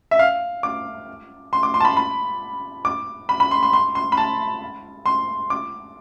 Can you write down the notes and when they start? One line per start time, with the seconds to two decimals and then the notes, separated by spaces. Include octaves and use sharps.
0.11 E5
0.19 F5
0.63 D6
1.53 C6
1.63 D6
1.74 C6
1.80 A5
1.85 B5
1.97 B5
2.85 D6
3.29 B5
3.40 B5
3.51 C6
3.63 C6
3.73 C6
3.95 C6
4.12 B5
4.17 A5
5.06 C6
5.50 D6